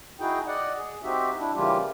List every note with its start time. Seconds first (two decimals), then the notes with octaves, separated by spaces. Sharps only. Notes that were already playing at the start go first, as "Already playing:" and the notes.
0.20 D#4 E4 F#4 G#4 G5
0.47 D5 D#5 F#5
0.77 G#4
1.03 C4 D#4 F#4 G4 E5
1.39 D4 E4
1.55 C#3 E3 G3 A#3 F4 G4